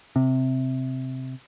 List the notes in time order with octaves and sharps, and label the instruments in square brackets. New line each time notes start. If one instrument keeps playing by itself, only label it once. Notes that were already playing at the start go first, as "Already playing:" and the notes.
[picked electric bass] C3